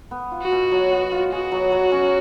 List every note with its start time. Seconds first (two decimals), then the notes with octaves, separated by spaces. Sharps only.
0.11 B3
0.32 F4
0.42 F#4
0.52 B2
0.72 F#3
0.91 B3
1.12 F4
1.32 F#4 G#4
1.52 F#3
1.72 F#3
1.92 C#4